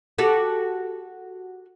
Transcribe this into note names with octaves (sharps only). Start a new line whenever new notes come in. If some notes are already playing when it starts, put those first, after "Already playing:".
F#4 G4 A4